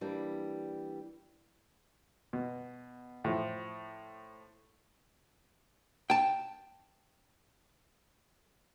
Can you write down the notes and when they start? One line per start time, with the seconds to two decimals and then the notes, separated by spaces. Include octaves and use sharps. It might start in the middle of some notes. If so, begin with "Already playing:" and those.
0.01 E3 G3 A#3 D4
2.33 B2
3.24 A2 F3
6.10 G5 A5